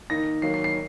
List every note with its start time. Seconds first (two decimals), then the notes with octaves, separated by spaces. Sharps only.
0.10 D#3 A#3 D#4 A#6
0.42 D#3 F#3 A#3 C7
0.54 C7
0.64 C7